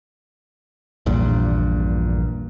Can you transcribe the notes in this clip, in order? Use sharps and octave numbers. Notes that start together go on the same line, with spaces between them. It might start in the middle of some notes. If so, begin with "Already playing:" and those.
A#1 E2 G2 A#2